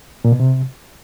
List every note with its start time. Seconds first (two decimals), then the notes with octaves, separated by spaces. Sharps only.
0.25 A#2
0.32 B2
0.40 C3